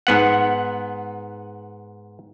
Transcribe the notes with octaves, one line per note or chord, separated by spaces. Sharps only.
G#2 B3 F#5